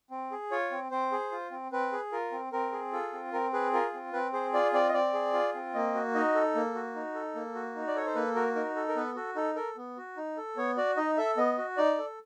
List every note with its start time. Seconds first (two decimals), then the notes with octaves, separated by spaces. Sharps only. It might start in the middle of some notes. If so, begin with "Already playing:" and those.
0.10 C4
0.32 G#4
0.51 F4 C#5
0.71 C4
0.91 C4 C5
1.12 G#4
1.31 F4
1.51 C4
1.72 C4 B4
1.92 G#4
2.12 F4 A#4
2.32 C4
2.52 C4 A#4
2.73 G#4
2.93 F4 A4
3.13 C4
3.32 C4 A#4
3.53 G#4 B4
3.73 F4 A#4
3.94 C4
4.13 C4 B4
4.33 G#4 C5
4.53 F4 D5
4.73 C4 D5
4.89 D#5
4.94 C4 D5
5.14 G#4
5.33 F4
5.54 C4
5.74 A#3 D#5
5.95 F#4
6.15 D#4 D#5
6.35 A4
6.55 A#3
6.75 F#4
6.95 D#4
7.15 A4
7.35 A#3
7.55 F#4
7.75 D#4
7.87 D5
7.96 A4 C#5
8.06 C5
8.15 A#3 B4
8.35 F#4 A#4
8.55 D#4 A#4
8.76 A4
8.88 A#4
8.95 B3 B4
9.16 F#4 A4
9.36 D#4 A4
9.56 A4 A#4
9.77 B3
9.97 F#4
10.17 D#4
10.37 A4
10.57 B3 C#5
10.77 F#4 D5
10.97 D#4 D#5
11.17 A4 E5
11.37 B3 D#5
11.58 F#4
11.77 D#4 D5
11.98 A4